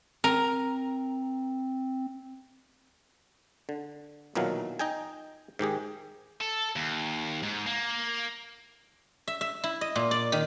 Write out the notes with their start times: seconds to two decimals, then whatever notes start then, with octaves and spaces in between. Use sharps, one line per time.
0.24 C4 A#4
3.69 D3
4.35 B1 A#2 D#3 E3 F#3 F5
4.79 D#4 D#5 G5 G#5
5.59 G#2 D#3 G4 G#4
6.41 A4
6.76 D#2
7.43 G#2
7.67 A#3
9.28 E5
9.41 E5
9.64 E4
9.81 D#5
9.96 A#2
10.11 D5
10.32 D#3